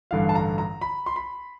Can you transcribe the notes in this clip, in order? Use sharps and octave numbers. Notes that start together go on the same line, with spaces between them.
A1 G2 D3 F5
A5
A#5
A#5
B5
C6
B5